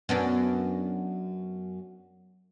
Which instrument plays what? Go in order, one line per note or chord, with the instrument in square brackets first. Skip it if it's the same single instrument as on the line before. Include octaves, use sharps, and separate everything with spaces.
[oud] F#2 B3 D4